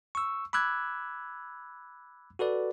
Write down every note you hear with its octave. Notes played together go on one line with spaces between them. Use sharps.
C#6 E6
B5 D6 E6 F#6 G#6
F#4 A4 B4 D5